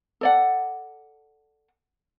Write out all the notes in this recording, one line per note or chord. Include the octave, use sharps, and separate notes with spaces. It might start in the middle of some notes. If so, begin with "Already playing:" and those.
A4 D5 F#5